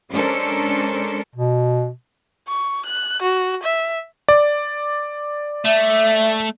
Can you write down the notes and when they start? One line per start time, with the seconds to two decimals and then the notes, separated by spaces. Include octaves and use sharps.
0.11 G#3 C#4 D4 A4 A#4 C5
1.35 B2
2.48 C#6
2.86 F#6
3.22 F#4
3.63 E5
4.28 D5
5.65 A3 E5